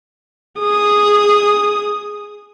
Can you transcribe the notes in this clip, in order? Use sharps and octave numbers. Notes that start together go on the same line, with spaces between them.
G#4 D#6